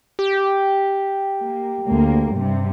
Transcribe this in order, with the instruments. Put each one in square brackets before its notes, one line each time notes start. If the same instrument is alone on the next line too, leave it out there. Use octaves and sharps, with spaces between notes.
[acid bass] G4
[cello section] A#3
D2 A#3
G2 C3